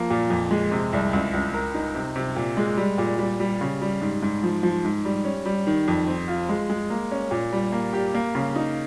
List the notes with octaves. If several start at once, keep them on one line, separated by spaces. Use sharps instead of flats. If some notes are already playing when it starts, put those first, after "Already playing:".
Already playing: F3 A#3
A#2
F2
G#3
C3
C2
C#2
C#2
A#4
D#4
C3
C3
A#2
G#3
G3
A#2
G3
G3
C#3
G3
G#2
G#2
F3
F3
G#2
G3
C#4
G3
D#3
F2
C4
F4
G#3
G#3
A#3
C#4
A#2
G3
A#3
G4
A#3
C#3
D#4